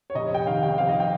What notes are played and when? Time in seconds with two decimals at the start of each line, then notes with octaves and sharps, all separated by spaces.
0.10 C#5
0.15 F1 D#5
0.31 F1 G5
0.47 D#3 F5
0.63 D#2 G5
0.78 F2 F5
0.89 D#5
1.00 G5